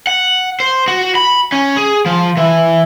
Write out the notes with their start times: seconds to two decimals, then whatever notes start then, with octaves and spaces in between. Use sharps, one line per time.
0.07 F#5
0.60 C5
0.88 F#4
1.15 B5
1.52 C#4
1.76 G#4
2.06 F3
2.37 E3